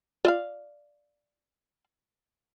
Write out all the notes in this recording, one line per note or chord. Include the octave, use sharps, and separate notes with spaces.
F4 D5 E5 F5